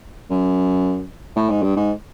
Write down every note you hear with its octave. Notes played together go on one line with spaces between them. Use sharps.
F#2
A2
G#2
G2
G#2